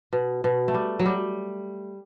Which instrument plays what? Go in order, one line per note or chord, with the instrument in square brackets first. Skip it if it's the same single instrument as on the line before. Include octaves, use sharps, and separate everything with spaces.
[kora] B2
B2
A3
G3
F#3
G3